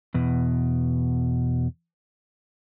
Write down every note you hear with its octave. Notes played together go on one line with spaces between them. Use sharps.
E2 B2